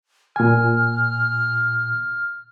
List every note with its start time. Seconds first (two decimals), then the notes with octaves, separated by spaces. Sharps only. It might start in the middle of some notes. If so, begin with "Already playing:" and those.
0.36 A#2 G#5 F6